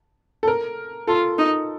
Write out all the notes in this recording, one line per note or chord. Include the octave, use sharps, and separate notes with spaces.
A4
A#4
F4 A4
D#4